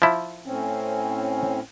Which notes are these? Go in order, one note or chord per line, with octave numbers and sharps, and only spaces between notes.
F3 E4
A2 C4 C#4